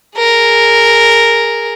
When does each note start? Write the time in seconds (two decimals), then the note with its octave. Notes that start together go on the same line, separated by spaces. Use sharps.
0.18 G#4 A#4